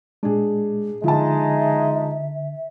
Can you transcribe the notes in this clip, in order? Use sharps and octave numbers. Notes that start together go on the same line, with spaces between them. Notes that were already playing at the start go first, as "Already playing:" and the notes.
A#2 G#3 D4 G#4
D3 F3 G#3 D#4 E5 A5